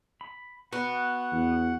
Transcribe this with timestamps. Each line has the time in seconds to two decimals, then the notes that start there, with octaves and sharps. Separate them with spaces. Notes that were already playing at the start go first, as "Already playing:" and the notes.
0.21 B5
0.73 B3 F#4 F#5
1.32 E2